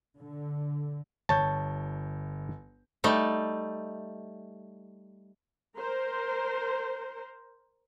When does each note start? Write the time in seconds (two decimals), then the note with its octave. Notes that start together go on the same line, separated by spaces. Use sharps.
0.18 D3
1.29 G1 C#5 A5 G6
3.04 G3 A3 D#4
5.76 A#4 C5